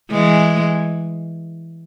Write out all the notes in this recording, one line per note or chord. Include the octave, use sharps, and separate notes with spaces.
E3 G#3